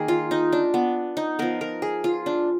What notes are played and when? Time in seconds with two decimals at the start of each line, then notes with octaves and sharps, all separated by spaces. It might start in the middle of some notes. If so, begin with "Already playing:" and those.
Already playing: D#3 A#3 G#4 A#4
0.08 F4
0.31 D#4
0.52 D4
0.74 B3
1.17 D#4
1.39 F3 B3 A#4
1.61 A#4
1.82 G#4
2.04 F4
2.26 D4